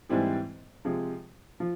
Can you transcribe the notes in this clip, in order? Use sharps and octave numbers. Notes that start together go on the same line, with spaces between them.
G#2 E3 G3 C4 E4
C3 F3 G#3
F3